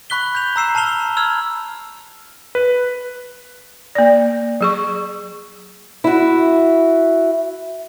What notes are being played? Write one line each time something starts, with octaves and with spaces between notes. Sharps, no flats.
B5 C#6 F#6 B6 G7
G6 F7
A#5 E6 C7 E7
A5 F6 C7 F7 G7
B5 E6 F6 G#6 F7
B4
A#3 D5
F#3 G#4 C#6
E4 F#4